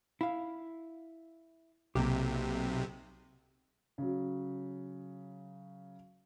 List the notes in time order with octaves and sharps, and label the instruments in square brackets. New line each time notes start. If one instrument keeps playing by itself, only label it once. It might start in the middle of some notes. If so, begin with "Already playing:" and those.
[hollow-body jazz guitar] E4 F5
[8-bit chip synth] B1 C3 [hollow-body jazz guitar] A#3 G4
[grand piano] C#3 F#3